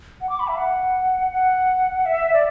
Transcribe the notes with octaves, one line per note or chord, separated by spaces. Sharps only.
F#5
D6
B5
E5
F#5
F#5
E5
D5